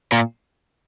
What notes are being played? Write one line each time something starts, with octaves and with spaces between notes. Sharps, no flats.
A#2